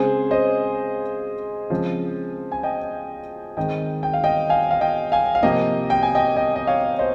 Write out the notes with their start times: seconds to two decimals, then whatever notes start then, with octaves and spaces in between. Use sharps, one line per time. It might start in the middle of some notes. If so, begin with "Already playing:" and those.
Already playing: C#3 G#3 C4 G#4 C5
0.31 C5 D#5
1.70 C#3 F3 G#3 C4
2.52 G#5
2.63 D#5 G5
3.57 D#3 G#3 C4 D#5 G5
4.03 G5
4.14 F5
4.24 D#5 G5
4.49 F5 G#5
4.71 F5
4.81 D#5 G5
5.12 F5 G#5
5.35 F5
5.43 C3 F3 A#3 D#5 G5
5.90 G5
6.03 G#5
6.15 D#5 G5
6.36 D#5 G5
6.56 D#5
6.67 C#5 F5
6.99 C5 D#5